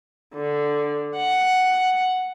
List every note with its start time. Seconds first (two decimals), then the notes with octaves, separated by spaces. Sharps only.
0.35 D3
1.16 F#5